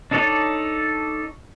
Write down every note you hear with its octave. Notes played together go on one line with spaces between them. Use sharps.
D4 D#4 A4 C#5 D5